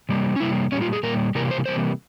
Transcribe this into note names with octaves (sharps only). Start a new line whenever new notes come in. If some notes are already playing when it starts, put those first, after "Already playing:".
C3 G3 A#3
C#4
C3 G3 A#3 E4
A#2 G3 A#3 C#4
F4
G#4
A#2 G3 A#3 A#4
C3 E3 G3 A#3 A#4
C5
C3 E3 G3 A#3 C5